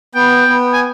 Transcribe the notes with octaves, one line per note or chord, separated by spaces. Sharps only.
B3 G5
B3
G#5